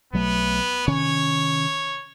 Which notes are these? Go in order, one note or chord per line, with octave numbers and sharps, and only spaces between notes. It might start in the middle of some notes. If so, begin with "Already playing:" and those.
B1 F#3 A3 B3
C3 D#3 C#4 C#5